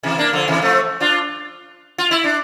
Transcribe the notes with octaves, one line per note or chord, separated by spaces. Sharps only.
C3 E3
A#3 D4
D3 F3
C3 E3
F3 A3
D4 F4
F4
E4
D4